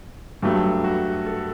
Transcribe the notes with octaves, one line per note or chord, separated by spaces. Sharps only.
G2 F#3 A3 G4
F#4
A4